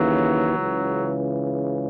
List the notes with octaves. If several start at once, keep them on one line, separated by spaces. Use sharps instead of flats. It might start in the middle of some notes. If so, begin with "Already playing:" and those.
Already playing: D#2 C#3 E3 F#3
C#2 C#3 E3